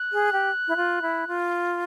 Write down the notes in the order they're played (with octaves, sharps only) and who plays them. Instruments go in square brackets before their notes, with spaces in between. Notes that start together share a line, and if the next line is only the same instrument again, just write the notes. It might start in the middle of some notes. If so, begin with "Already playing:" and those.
Already playing: [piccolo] F#6
[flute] G#4
G4
E4
F4
E4
F4